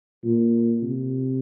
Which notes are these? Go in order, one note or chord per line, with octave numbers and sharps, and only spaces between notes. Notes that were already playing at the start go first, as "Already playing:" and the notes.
A#2
C3